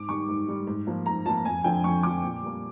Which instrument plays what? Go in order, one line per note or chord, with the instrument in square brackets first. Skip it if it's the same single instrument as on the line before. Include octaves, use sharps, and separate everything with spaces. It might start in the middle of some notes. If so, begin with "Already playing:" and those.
Already playing: [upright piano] G#2 D6
D#3 G3 C#6
G#2
D#3 G3
G#2
F3 A#3
G#2 A#5
F3 A#3 A5
F2 G#5
D3 F3 G5
F2 C#6
D3 F3 D6
A#2
G3 A#3